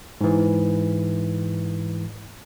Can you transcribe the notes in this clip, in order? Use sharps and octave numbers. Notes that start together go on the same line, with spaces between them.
G#2 E3